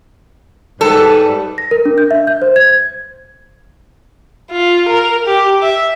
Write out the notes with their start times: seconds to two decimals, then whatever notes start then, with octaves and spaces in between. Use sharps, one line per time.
0.81 G#2 G3 A4 B4
1.58 A#6
1.71 A#4
1.85 D4
1.98 G6
2.11 E5
2.27 G6
2.42 C5
2.56 G#6
4.51 F4
4.88 A#4
5.27 G4
5.62 E5